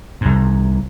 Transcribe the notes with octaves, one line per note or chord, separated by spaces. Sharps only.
C2 G#2